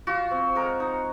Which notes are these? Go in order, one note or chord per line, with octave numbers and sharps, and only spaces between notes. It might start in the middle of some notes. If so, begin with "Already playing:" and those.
F4 F#4
C4
G#3 A#4
D#4